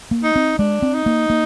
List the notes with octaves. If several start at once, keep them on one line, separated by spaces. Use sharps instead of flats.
A#3
D#4
C4
G#3 D4
C4
D#4
A#3
A#3